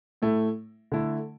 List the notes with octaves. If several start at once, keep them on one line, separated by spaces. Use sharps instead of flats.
A2 A3 E4
D3 A3 E4